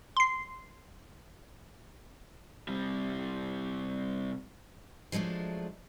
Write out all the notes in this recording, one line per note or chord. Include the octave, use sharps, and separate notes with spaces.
C6 C7
C3 G3
F3 F#3 G#3 A3 D4